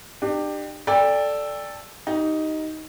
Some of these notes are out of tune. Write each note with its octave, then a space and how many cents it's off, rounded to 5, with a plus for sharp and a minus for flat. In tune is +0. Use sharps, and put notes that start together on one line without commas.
D4 +40 G4 +10
A4 +0 D5 +0 G5 +30
D#4 +5 G4 -30